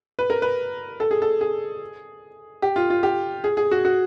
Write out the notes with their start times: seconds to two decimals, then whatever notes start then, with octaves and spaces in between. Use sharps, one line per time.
0.19 B4
0.30 A#4
0.42 B4
1.00 A4
1.11 G#4
1.22 A4
1.41 G#4
2.62 G4
2.76 F4
2.90 F4
3.03 G4
3.44 G#4
3.57 G#4
3.71 F#4
3.85 F#4